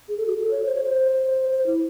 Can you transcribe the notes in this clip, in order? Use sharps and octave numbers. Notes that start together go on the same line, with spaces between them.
G#4
A4
F#4
A4
C#5
C5
C#5
C5
C5
E4